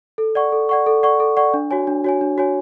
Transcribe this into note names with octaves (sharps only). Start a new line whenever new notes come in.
A4
D5 F#5 C#6
A4
D5 F#5 C#6
A4
D5 F#5 C#6
A4
D5 F#5 C#6
D4
F#4 C#5 G#5
D4
F#4 C#5 G#5
D4
F#4 C#5 G#5